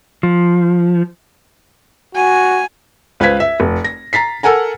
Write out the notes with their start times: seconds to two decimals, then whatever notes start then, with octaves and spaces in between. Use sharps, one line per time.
0.23 F3
2.15 F#4 G#5
3.20 C#2 B4 C5 F5 G#6 B6
3.40 E5
3.60 F1
3.85 A#6
4.13 A#5 A6 B6 C7
4.43 A4 A#4 F#5 G#5 A#5